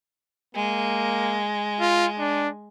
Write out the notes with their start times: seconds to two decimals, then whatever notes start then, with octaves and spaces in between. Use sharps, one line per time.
0.55 G#3 A#3
1.80 F4
2.19 D4